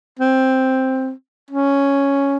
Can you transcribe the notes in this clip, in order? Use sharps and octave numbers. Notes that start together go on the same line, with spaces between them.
C4
C#4